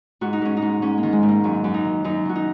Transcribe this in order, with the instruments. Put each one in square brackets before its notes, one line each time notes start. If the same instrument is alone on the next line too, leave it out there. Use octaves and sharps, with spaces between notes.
[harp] G#2 F#4
D#4
G#2 C#4
D#4
G#2
G#2 C#4
A#3
D#3
G#3
G#2
A#3
F#2 C#4
F#2
D#4
D#3
F#2 D#4
D#3 F#4
D#4